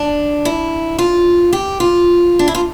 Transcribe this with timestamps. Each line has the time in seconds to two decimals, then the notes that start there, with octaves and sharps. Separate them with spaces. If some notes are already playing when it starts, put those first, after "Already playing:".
Already playing: D4
0.45 E4
0.99 F4
1.53 G4
1.80 F4
2.39 D4
2.48 E4
2.55 F4